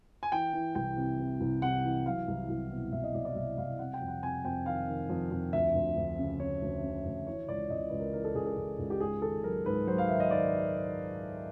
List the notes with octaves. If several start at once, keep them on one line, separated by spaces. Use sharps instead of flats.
G#5
E3 G5
E3
C2 G5
C3
C3
C2
C3 F#5
E3
F#3 F5
C2
C2
B2
C2 E5
D#5
C2 D5
D5
C2 E5
C2 F5
C3 F#5
G5
F2
F#5
C3 G#5
F2 G5
D#3 F5
D#3
F2
F2
D2 E5
D2
D2
C#3
C#3 C#5
D2
C#3
D2
E3 C#5
C#2 D5
C#2 D#5
C#2 B4
A#4
E3 A#4
A4
C#2 G#4
A4
C#2
C#2
G4
G#2 G#4
D#3 A4
F#3 A#4
G#2 B4
F#3 C5
F5
D#3 E5
D#5
D#3 D5